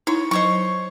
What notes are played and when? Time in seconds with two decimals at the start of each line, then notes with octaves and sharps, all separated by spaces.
0.07 D#4 E4 C#5
0.31 F#3 C5 C#5 D#5 C#6